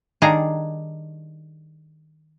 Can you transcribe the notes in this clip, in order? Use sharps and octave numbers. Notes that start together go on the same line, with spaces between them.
D#3 G3 D4 G#4 F5 A#5